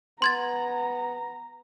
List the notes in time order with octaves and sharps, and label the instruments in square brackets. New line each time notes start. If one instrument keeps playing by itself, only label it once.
[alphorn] B3 [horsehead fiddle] A#5 [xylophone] C6 G#6 A6